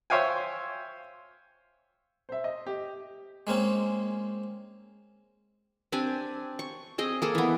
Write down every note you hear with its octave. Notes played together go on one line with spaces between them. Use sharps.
C5 C#5 E5 F5 G5 G#5
C5 E5
D#5
G4
G#3 A#3 C4 C#4
C4 D4 G4 G#5
C#6
C4 G#4 D#5
A#3 G#4 A4
E3 B3